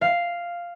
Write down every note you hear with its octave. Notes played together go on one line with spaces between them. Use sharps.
F5